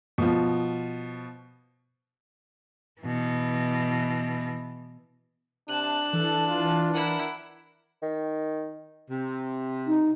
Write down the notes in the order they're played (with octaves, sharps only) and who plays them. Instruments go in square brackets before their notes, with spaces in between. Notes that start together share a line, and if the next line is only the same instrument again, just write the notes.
[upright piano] B2 F3
[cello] B2 E3
[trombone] C3 [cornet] D4 [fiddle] A5 F#6
[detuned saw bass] E3 [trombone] A4
[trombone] F4
[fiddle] E4 F#5 [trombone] A#4
[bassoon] D#3
[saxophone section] C3
[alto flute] D#4